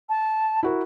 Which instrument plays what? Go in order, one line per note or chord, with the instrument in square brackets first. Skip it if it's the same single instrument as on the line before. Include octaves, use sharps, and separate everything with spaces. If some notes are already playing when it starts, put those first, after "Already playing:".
[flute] A5
[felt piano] E4 F#4 A#4